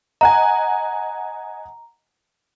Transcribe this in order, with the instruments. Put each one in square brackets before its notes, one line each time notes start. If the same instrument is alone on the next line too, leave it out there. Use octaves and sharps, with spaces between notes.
[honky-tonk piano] D#5 F#5 G#5 [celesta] A#5